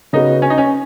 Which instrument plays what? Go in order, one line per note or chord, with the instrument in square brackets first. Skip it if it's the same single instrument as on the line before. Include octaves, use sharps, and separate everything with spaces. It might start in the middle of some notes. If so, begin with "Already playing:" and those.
[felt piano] C#3 B3 F#4 [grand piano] D#4
[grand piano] C#4
D#4
C#4